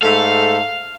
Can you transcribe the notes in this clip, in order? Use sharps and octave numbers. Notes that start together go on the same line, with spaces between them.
G#2 A3 A4 F5